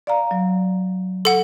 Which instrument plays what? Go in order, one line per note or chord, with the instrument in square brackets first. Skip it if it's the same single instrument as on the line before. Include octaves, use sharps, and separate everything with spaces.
[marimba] D5 F5 A#5
F#3
[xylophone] A4 F#5